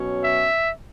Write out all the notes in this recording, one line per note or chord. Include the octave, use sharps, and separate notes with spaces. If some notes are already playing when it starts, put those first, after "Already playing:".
Already playing: B2 F#3 C#4
E5